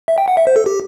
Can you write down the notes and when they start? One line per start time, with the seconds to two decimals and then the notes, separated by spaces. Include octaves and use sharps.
0.08 E5
0.18 G5
0.28 F#5
0.37 E5
0.47 C5
0.56 A4
0.66 G4